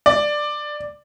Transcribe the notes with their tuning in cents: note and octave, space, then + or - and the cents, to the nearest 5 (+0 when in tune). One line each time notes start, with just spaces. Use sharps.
D5 +10